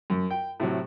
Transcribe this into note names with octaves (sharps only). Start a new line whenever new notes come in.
F#2
G5
A2 C3 F#3